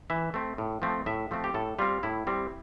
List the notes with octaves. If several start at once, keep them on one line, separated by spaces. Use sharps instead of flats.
E3 E5
A3 C4
A2
F3 A3 C4
A2 E5
F3 A3 C4
G4
A2 A4
G3 C4 F4
A2 E4
G3 C4